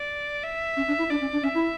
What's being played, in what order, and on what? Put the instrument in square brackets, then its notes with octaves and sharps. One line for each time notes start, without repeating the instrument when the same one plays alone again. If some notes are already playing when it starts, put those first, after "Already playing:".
Already playing: [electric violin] D5
E5
[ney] C#4
D4
E4
[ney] D4 [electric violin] D5
[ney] C#4
D4
[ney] C#4 [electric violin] E5
[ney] E4